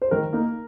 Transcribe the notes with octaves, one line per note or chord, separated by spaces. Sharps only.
C5
D#3 A#4
A#3 D#4